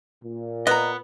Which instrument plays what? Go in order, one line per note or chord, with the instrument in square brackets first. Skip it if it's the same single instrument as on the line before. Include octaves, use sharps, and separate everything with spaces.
[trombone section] A#2
[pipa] B3 [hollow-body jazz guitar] D#5 A#5